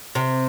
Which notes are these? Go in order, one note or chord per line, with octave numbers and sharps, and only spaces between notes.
C3